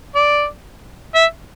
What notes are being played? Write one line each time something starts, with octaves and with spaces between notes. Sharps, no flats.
D5
E5